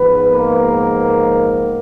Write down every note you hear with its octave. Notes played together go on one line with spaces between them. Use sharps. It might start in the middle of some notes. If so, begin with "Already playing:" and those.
Already playing: G#2 F3 G#3 B3 B4
A#3 A#4